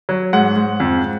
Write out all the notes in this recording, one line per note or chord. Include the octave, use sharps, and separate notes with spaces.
F#3
G#2 F#5
G#2
F2